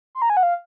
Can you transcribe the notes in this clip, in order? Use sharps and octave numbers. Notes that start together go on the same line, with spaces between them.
C6
A#5
G#5
F#5
F5